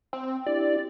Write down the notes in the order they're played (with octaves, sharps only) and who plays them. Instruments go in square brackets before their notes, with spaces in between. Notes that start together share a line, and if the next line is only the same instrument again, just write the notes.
[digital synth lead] C4
[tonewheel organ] D4 E4 G4 [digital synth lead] D5